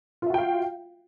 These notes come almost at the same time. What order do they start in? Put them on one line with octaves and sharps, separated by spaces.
F4 E5 F#4 G5 F5